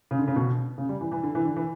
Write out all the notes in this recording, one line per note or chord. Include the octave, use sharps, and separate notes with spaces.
C#3
D3
C#3
B2
C#3
G3
E3
E3
D3
E3
D3
E3